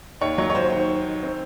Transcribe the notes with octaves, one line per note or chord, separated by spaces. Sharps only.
D#2 C#5
F#3 C#5
C#5
D#2 C5
D#3 C5
D#3
D#3
C4